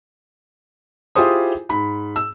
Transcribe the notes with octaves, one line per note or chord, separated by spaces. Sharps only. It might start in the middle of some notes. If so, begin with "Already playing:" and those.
E4 F4 G4 G#4 C5 D#6
G#2 B5
E6